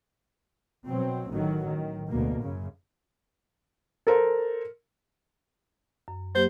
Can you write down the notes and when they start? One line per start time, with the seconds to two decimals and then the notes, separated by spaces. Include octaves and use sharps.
0.87 B2 F#3 C4
1.30 A1 A2 D#3 F#3
1.66 D#3
2.09 D2 B2 A#3
2.40 F#2 C#3
4.07 A4 A#4 C5
6.08 F#2
6.35 F#3 A#3 G4 C5